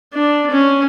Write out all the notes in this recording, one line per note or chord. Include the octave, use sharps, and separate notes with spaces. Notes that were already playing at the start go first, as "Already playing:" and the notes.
D4
C#4